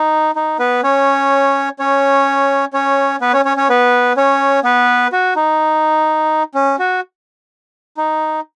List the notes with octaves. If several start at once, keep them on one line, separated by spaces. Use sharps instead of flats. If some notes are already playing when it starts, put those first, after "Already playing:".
Already playing: D#4
D#4
B3 B4
C#4 C#5
C#4 C#5
C#4 C#5
B3 B4
C#4 C#5
C#4 C#5
C#4 C#5
B3 B4
C#4 C#5
B3 B4
F#4
D#4
C#4
F#4
D#4